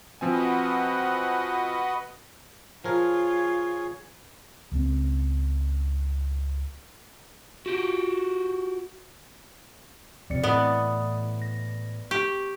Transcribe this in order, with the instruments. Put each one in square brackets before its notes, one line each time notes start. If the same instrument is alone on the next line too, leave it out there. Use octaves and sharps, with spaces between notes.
[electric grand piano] F3 C4 G#5 [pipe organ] F#4 B4 D#5
[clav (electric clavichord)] F3 A#4 [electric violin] F4 [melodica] G#4 C#5
[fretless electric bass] C#2 F#3 C4
[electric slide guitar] F#4 G4
[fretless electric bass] F2 C3 [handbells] C4 D5 C#7
[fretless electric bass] A2 E3 [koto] B3 [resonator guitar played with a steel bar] D5 D#5 [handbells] D#6
[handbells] A#6
[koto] G4 [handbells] C#6